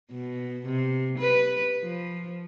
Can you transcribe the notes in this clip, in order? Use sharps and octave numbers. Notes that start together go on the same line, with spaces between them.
B2
C3
B4
F3